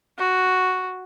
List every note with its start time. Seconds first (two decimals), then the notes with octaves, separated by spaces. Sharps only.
0.18 F#4